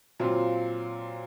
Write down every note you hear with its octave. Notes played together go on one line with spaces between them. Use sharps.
A#2 F#3 C4 F4